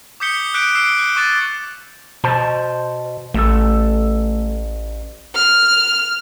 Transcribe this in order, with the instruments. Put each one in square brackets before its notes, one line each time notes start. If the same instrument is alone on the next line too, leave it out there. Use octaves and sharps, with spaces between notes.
[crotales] D6 D#6 G6 B6 C#7 G7
D6 F#6 G6 B6 C#7 D7
D6 E6 C7 D7 G7
F#6
C#6 D6 F#6 A6
[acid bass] B2 [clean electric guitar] C5 A5
[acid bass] A1 [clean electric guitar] A3 A4
[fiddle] F6